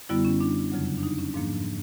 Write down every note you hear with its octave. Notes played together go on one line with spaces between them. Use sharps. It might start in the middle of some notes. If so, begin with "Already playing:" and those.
F#2 D3 G3 B3 E4
C#4
D4
F2 C#3 F#3
D4
D#4
C#4
G#2 F3 A#3 D4